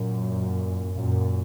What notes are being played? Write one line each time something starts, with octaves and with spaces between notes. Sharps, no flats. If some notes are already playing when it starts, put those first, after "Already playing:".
Already playing: F#2 A#2
F#2 A#2